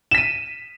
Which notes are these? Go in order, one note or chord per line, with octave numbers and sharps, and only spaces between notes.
B6 D#7 E7